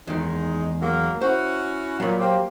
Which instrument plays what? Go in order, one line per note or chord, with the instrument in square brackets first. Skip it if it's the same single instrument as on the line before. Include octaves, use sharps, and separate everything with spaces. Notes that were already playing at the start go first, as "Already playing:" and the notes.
[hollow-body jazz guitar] E2 D#3 [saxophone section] G#3 D#4
[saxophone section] F#3 G#3 A#3
[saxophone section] C#4 E4 F#4 [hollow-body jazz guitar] C5
[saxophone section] A#2 [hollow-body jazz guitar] F#3 B5
[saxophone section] A#3 C4 G4